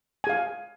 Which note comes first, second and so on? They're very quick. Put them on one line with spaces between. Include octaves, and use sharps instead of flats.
G#5 G#4 F5